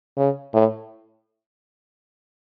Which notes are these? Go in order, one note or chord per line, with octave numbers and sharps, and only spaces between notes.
C#3
A2